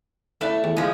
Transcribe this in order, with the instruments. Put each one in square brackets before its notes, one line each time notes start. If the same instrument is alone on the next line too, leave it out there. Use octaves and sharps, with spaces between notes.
[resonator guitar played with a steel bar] A3 [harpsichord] E4 B4 D5
[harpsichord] E2
[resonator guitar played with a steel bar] F3 G#3